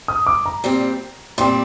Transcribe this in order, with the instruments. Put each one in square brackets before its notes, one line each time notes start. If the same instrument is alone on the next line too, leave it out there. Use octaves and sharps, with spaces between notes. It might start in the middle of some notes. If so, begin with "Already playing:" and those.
[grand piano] D#6
D6
A#5
[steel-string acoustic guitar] A#2 G3 C4
[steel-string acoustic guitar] A#2 G3 C4 [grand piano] C6